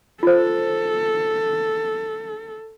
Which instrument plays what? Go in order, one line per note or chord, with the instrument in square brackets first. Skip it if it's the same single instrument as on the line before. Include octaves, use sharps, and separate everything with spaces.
[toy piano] F4 C5 [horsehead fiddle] A4